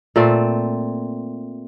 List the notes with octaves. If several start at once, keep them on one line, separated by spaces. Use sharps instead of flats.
A#2 A3 C4